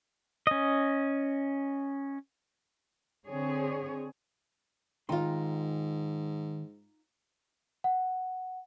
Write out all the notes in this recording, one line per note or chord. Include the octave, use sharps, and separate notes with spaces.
C#4 D#5
D3 C4 G#4 C#5
G#2 D#3 D#4 F4 G5 C6
F#5